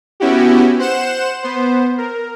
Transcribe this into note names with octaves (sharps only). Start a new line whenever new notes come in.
B3 C#4 E4 F#4 G4
C5 F#5 E7
B3 C5
A#4